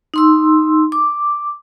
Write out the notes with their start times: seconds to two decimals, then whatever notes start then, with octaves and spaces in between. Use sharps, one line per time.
0.14 D#4 C6 E6
0.92 D6